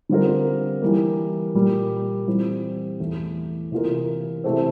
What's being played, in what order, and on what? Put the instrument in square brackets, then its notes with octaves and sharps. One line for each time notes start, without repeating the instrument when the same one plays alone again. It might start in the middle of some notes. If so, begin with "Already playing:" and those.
[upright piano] D3 G3 C4 F4 A#4
E3 G3 A#3
A#2 G3 A#3
E3 G3 C4 F4
E2 E3 A3
C3 E3 A#3 F4 A#4
C3 E3 A3 C4